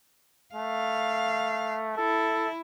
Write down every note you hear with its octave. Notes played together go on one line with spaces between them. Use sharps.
A3 F5
E4 A4